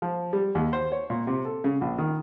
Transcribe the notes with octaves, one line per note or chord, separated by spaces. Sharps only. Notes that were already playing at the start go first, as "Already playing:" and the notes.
F3
G3
D#2
C5
C#5
A#2
C3
A4
C#3
A#1
D#3